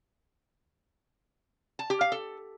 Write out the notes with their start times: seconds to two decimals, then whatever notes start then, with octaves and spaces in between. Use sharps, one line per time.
1.79 A5
1.90 G4
2.01 F5
2.12 A4